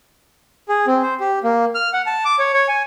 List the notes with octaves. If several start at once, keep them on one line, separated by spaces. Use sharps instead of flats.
G#4
C4
C5
G4
A#3
F6
F#5
A5
D6
C#5
C#5
G#5